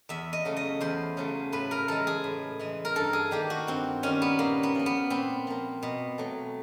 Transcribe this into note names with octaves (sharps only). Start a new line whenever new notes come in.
E2 E5
D#5
C#3 F#3 A3
D#5
E2 C5
C#3 F#3 A3
A2 B4
A#4
E3 G#3 A4
G#4
A2
E3 G#3
A#4
G2 A4
G#4
D#3 G3 A#3 G4
F#4
G2 C4
D#3 G3 A#3 C#4
B3
A#2 A#3
B3
F3 A#3
B3
A#2 C4
F3 A#3
B2
F#3 A3